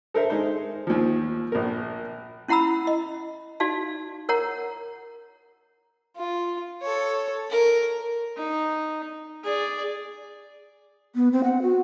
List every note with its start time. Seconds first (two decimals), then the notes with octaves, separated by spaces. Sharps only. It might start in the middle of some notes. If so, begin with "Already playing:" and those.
0.14 A4 A#4 C5 E5
0.30 G#3 D#4 C5
0.87 D#2 F3
1.52 A#1 A#4
2.48 C#4 E4 F#5 A#5 B5 E6
2.87 D#5
3.60 D#4 F#4 D5 F5 A5
4.29 A#4 C#5 F#5 A#5
6.16 F4
6.82 A4 C#5
7.50 A#4
8.37 D#4
9.44 G#4 D5
11.15 B3
11.32 C4
11.44 F#5
11.62 F#4